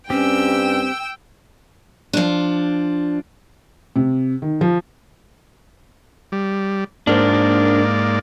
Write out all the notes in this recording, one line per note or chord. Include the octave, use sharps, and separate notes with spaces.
G2 C4 C#4 G4 G5 E6
F3 D4
C3
D#3
F3
G3
G#2 A#3 D4 A#4 C5 D5